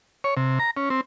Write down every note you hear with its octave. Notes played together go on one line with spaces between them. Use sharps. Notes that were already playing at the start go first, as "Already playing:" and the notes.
C#5
C3
A#5
C#4
C4